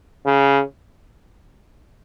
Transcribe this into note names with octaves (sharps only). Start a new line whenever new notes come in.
C#3